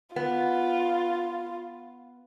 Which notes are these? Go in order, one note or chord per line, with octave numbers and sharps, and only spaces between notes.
B3 F4